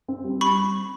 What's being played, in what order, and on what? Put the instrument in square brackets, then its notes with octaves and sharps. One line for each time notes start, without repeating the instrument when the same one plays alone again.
[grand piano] C4
G3
[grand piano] G3 [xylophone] B5 C#6